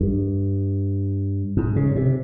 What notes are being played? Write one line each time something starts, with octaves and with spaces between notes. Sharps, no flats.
G2
G#2
C#3
C3